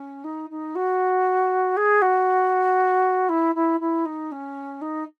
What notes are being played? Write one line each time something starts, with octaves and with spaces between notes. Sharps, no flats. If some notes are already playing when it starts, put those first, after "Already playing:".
Already playing: C#4
D#4
D#4
F#4
G#4
F#4
E4
E4
E4
D#4
C#4
D#4